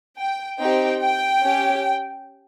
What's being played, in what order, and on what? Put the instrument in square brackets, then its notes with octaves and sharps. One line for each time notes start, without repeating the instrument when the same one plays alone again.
[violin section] G5
C4 D#4 G4 G5
G5
C#4 G4